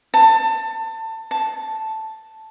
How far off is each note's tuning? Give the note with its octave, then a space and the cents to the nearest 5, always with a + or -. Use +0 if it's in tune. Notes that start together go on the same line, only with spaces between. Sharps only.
A5 +25
A5 -5